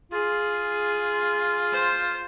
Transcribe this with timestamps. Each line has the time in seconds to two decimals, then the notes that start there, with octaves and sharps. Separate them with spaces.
0.12 F4 G#4
1.72 C5